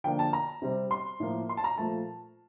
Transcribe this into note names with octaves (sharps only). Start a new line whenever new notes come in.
D3 F3 A#3 D4 G5
A5
A#5
C3 G3 C4
C6
A2 F3 A#3
C6
A5
A#5
A#2 F3 A3 A5